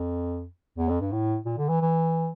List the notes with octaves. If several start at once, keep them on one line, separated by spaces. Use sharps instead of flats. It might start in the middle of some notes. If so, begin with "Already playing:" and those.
Already playing: F2
E2
F2
G2
A2
A#2
D3
E3
E3